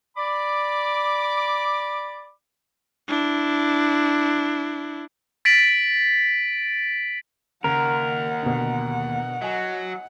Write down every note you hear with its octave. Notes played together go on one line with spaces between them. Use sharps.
D5 B5 D6
D4 E4
A6 B6 D7 F#7
D#2 C#3 A#4 F#5
B2 D3
F#3 D#5 G#5